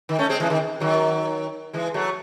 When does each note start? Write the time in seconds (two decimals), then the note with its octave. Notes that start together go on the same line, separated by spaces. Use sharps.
0.09 D#3
0.19 A3 C#4
0.29 G#3 C4
0.40 E3 G#3
0.50 D#3
0.80 D#3 F#3
1.73 E3 G#3
1.94 F#3 A3